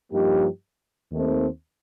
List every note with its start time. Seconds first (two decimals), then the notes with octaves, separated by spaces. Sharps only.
0.12 G2 F3 A#3 D#4 G4
1.12 D#2 D#3 A3 C4